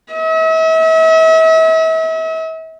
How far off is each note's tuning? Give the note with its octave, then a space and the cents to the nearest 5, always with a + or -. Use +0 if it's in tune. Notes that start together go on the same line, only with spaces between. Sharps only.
E5 -40